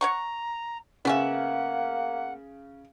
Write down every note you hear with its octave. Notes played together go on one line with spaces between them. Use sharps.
C#5 F#5 A#5 C#6
C#3 A#3 B3 C#4 E5 F#5